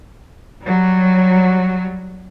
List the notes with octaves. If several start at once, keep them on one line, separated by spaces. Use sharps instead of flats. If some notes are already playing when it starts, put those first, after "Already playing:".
F#3 G3